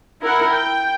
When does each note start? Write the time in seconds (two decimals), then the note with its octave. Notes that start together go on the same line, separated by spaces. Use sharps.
0.21 E4 A#4 F#5
0.50 G5